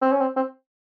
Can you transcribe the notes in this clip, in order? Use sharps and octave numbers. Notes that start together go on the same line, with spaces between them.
C4
C#4
C4
C4